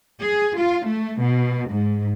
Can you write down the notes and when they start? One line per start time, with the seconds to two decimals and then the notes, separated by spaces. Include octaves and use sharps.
0.22 G#4
0.57 F4
0.87 A3
1.21 B2
1.70 G#2